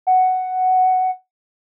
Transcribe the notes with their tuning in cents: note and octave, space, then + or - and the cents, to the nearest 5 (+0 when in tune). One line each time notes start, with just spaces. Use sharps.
F#5 +5